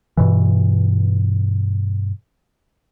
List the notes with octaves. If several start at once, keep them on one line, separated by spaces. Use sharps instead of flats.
G2 B2 E3